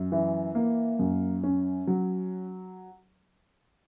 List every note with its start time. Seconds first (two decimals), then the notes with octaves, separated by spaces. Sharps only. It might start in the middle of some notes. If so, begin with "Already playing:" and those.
Already playing: F#2
0.12 E3
0.55 A#3
0.99 F#2
1.43 C#4
1.87 F#3